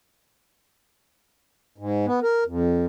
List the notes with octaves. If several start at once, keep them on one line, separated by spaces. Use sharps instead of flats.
G#2
B3
A#4
F2